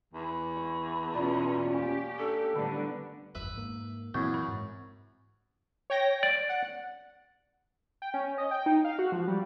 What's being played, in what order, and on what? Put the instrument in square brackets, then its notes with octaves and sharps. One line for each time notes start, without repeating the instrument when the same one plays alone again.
[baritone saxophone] E2
[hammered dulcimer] C#6
[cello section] B2 C#4 [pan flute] F4 [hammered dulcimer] D5
[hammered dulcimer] A#3 C#4 [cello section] G4
[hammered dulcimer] D4 [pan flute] A4
[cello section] A2 D3 G3 [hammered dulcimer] B3 D4 B4
[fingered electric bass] G1 F2 [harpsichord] B4 E5 [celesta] E6
[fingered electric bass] G#2 A#3
[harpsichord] F#2 [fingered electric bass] A#2 E3 [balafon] C4 E4 [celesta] C#6 D#6 G#6
[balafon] B5
[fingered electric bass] G#2
[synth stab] C#5 G5 A#6
[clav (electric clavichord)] D5
[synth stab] F#5
[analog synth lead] G5
C#4
D#5
G5
D#4
F5
F#4
F3
G3